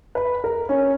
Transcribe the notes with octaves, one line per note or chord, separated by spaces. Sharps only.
B4
A#4
C#4